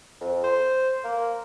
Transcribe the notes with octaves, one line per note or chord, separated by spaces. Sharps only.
F2
C5
A#3